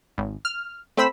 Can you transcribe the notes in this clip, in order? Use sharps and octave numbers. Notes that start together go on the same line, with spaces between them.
G#1
F6
A3 C4 C5 B5 E6 B6